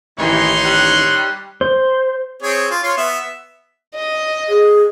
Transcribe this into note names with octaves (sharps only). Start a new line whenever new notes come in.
A1 D#3 E3 D#4 G4 C#5 C6
G3 F#6
C5
C4 G#4 C#5
F4
F4 C#5 C6
B3 E5
D#5
G#4